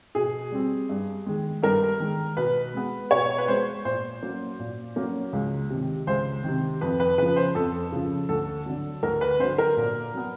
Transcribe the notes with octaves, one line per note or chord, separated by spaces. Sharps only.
B2 G#4
G3 C4
G2
D#3 G#3
G2 A#4
D#3 G#3
B2 B4
G#3 B3
B2 C#5
B4
G#3 B3 C5
A#2 C5
F#3 A#3 C#4
A#2
F#3 A#3 C#4
C#2
C3 D#3
C#2 C5
C3 D#3
F2 B4
B4
C#3 F3 B4
C5
F2 A4
C#3 F3
D2 A4
D3 F#3
D2 A#4
B4
D3 F#3 C5
A#4
A#2
F#3 B3